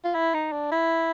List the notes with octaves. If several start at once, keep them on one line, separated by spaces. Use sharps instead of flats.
F4
E4
D#4
D4
E4